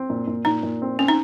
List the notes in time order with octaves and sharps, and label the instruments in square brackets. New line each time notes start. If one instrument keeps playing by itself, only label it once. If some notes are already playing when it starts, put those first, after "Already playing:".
Already playing: [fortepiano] C4
A#2
A#2
[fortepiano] A#2 [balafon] D#4
[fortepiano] A#2
C4
[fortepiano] C4 [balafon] C#4
[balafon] D#4